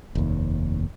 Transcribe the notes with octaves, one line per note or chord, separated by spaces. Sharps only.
F1 D#2